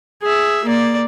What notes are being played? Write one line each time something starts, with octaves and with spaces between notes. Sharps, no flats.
G#4 E5
A#3 D5